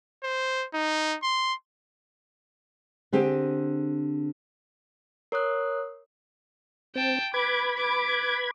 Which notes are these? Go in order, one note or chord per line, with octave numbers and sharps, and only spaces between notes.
C5
D#4
C6
D3 C4 G4 G#4
A#4 C#5 D#6 F#6
C4 G5 A5
B4 B5 D6 G#6
D6